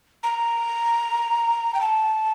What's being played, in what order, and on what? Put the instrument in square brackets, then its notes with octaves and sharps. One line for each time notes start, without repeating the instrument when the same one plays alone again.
[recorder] A#5
G5
A5